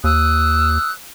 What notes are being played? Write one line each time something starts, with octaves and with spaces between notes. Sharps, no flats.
D#2 D#6 E6 F#6